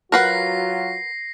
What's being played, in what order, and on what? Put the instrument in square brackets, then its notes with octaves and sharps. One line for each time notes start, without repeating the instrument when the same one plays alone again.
[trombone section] F#3 F4 F#4 [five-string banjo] A#4 B4 F#5 [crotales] A#6 C7